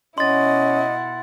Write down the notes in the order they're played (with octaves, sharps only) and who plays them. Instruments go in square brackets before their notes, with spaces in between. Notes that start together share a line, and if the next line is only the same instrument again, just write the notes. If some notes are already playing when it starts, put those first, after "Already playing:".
[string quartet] B2 E4 F#5 [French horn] C#4 [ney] D#5 [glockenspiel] C6 A6